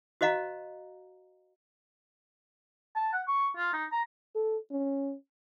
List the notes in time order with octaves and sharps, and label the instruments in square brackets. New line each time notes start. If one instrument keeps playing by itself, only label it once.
[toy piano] F#4 C5 D#5 F5 A#5
[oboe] A5
F#5
C#6
F4
D#4
A#5
[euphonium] A4
C#4